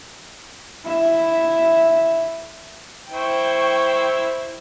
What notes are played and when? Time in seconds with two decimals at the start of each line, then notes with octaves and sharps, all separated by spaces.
0.85 E4 E5
3.11 E4 C5 G5 C#6